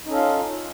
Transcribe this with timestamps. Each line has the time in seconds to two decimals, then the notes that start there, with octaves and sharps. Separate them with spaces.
0.06 D#4
0.08 C#4
0.11 A4
0.14 F5
0.17 F4